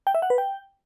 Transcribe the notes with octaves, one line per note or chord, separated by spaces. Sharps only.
G5
E5
F#5
B4
G5